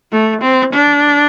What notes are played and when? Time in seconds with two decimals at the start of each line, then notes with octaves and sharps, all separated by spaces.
0.12 A3
0.42 C4
0.73 D4